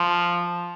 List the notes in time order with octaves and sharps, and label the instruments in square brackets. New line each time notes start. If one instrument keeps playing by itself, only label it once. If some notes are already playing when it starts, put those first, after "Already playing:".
Already playing: [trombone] F3